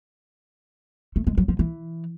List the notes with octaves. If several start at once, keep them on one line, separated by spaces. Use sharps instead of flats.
A3
G#3
F#3
F3
E3